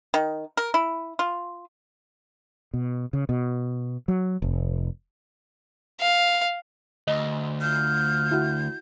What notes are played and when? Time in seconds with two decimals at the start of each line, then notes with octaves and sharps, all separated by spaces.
0.14 D#3
0.57 A#4
0.74 E4
1.19 F4
2.74 B2
3.13 C#3
3.29 B2
4.08 F#3
4.42 F1
6.00 F5
7.08 D2 D#5
7.61 F4 F6 G6
8.31 E4 F#4